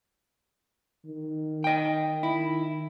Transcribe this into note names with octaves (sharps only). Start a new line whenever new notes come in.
D#3
D#5 G5
D#3 E4